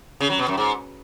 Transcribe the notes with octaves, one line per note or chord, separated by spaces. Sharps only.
C#3
F#3
B2
F#2
G#2